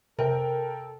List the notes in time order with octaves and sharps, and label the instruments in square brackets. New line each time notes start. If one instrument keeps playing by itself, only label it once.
[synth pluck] C3 [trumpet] A4 [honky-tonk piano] A#4 G5